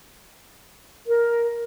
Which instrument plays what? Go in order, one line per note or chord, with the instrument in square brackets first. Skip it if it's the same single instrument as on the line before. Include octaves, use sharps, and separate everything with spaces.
[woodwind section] A#4